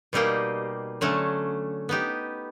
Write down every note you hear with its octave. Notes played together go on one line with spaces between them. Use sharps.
B2 G3 A#3 D#4 G4
D3 F#3 A3 C#4
B3 D#4 G4